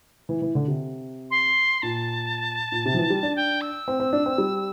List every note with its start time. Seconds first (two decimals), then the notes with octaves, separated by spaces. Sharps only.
0.29 E3
0.42 E3
0.55 D3
0.68 C3
1.31 C6
1.82 A#2 A5
2.72 A#2
2.85 C3
2.94 F3
2.98 E3
3.10 G3
3.23 D4
3.36 G5
3.61 E6
3.88 C4
4.00 C4
4.13 D4
4.26 C4
4.38 G3